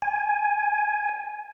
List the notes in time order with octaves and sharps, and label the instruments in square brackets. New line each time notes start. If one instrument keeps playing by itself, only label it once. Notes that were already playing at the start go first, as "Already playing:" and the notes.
[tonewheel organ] G#5